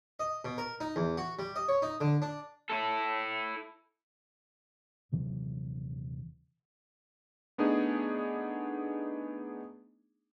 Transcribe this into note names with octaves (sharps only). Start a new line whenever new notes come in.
D#5
B2
A#4
D#4
E2
F#4
G3
D#5
C#5
D#4
D3
D4
E4 A4
D#1 C3 E3 F#3
A3 B3 D4 D#4 G#4